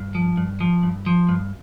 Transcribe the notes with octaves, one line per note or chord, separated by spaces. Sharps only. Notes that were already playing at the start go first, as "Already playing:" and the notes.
Already playing: G2
F3
G2
F3
G2
F3
G2